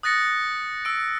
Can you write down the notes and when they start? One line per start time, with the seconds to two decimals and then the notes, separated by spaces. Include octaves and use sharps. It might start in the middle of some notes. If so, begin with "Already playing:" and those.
0.03 D#6 F#6 A6 A#6 C#7
0.85 E6 D7